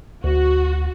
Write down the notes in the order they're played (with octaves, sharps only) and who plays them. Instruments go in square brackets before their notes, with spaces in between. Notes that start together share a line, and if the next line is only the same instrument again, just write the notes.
[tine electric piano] D2 [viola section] F#4